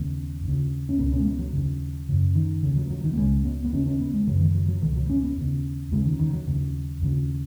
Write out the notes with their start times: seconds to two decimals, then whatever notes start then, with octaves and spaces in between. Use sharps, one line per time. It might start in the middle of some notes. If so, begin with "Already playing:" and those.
Already playing: D#2 C#3 B3
0.44 D#2 C#3
0.89 C#4
0.98 C#2 B2 B3
1.12 C#4
1.20 G#3
1.26 B3
1.39 F#3
1.53 D#2 C#3
2.09 F#2 C#3
2.35 D#3
2.63 D#2 C#3
2.77 F#3
2.90 F#3
3.04 D#3
3.13 B3
3.17 C#2 C#3 G#3
3.45 B3
3.65 B3
3.73 D#2 C#3 C#4
3.86 C#4
4.00 B3
4.14 G#3
4.27 F#2 C#3 F#3
4.41 D#3
4.55 F#3
4.68 F#3
4.82 C#2 B2 D#3
4.96 F#3
5.10 C#4
5.23 B3
5.37 D#2 C#3
5.92 D#2 C#3 G#3
6.06 D#3
6.19 D#3
6.33 F#3
6.47 D#2 C#3
7.02 D#2 C#3